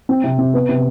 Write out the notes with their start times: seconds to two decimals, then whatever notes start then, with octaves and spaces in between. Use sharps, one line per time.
0.09 C4
0.24 C3
0.39 C3
0.54 B3
0.69 C3